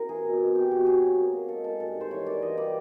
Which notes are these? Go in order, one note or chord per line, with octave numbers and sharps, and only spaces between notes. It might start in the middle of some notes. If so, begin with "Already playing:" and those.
Already playing: C4 E4 A#4
E3 G#4
B2
B2
C4 G4
B2 F#4
F#3 G#4
F#3
A#3
A#3
G#3 A4
G#3 A4
G2 A4
D#3
C5
E3 C#5
A#3 D5
E3 D#5
G3 D5